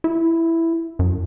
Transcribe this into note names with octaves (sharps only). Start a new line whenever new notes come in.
E4
F#2